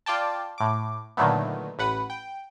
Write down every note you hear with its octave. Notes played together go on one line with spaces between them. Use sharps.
F4 D5 G5 A5
A2 D6
A#2 D3 D#3 F#3 A3 B3
A1 B4 F#5
G5